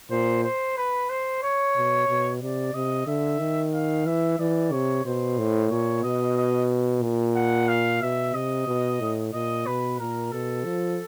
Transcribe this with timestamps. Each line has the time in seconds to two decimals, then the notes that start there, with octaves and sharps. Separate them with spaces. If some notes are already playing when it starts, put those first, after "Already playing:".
0.11 A#2 C5
0.44 C5
0.77 B4
1.10 C5
1.43 C#5
1.76 B2
2.09 B2
2.41 C3 D5
2.74 C3 D#5
3.07 D3 E5
3.40 D#3
3.73 F5
4.06 E3 E5
4.40 E3 D5
4.72 C3 C#5
5.05 B2 C5
5.38 A2
5.71 A#2 C#5
6.03 B2 D#5
6.37 D#5
7.03 A#2
7.36 F#5
7.68 F5
8.02 B2 E5
8.34 C3 D#5
8.67 B2
9.00 A2
9.34 A#2 D#5
9.66 B2 B4
9.99 A#2 A#4
10.32 B2 A4
10.65 F3